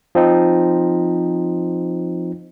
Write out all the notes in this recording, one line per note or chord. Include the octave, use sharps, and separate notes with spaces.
F3 C4 D#4